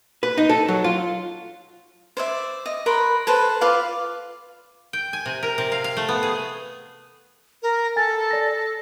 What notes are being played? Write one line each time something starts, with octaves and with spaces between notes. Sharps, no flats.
B4
D#4
A4
F#3
F4
C5 D5 E5
D#5
A#4 B4 B5 C6
A4 B4 C5
F4 B4 D5 F5
G5
G#5
C3
A#4
C3
F5
F5
A3
B3
G#4
A#4
A4 G#5 A6
D5 A#6